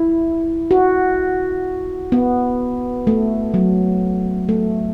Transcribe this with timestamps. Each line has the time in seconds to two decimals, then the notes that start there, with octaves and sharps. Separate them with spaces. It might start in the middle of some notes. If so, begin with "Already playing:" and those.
Already playing: E4
0.71 F#4
2.12 B3
3.07 A3
3.54 F#3
4.49 A3